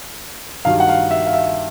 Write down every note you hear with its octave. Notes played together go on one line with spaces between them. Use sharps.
G2 D#3 F#3 F5
F#5
F5
E5
F5
E5